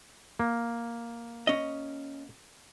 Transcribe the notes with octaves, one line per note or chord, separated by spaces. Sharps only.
A#3
C#4 D#5